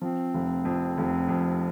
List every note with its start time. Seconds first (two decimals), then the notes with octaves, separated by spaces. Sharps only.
0.01 F3 C4
0.34 F1
0.65 F2
0.97 F1
1.29 F2